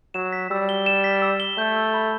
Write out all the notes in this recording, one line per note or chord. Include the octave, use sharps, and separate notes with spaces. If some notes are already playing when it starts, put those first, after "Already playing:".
F#3 E7
B6
G3 E6
G7
E7
B6
E6
G7
A3 G6
E6
B5